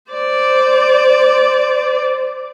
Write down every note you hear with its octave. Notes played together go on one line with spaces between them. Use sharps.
C5 D5